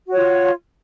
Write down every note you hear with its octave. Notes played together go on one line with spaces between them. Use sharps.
F4 F#4 C#5